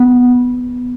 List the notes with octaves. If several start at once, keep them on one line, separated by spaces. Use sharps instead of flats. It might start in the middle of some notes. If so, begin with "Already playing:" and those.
Already playing: B3